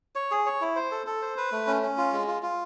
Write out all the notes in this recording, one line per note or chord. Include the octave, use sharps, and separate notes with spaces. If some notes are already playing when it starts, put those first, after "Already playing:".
C#5
G#4
C#5
E4
C5
A4
A4
C5
B4
A3
C#4
C#4
F4
G#3
F4
F4